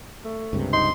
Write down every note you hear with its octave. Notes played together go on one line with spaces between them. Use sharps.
A3
C#2 G2 C3
D#4 C6